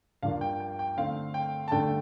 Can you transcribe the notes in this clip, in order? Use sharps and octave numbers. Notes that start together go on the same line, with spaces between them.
G2 F3 A#3 D4 F5
G5
G5
G5
D3 A3 C4 F5
G5
A5
G2 D3 A3 G5